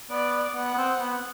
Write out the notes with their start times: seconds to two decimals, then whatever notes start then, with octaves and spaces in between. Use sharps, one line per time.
0.11 B3 D5
0.55 B3 F#5
0.74 B3
0.78 C4
1.00 B3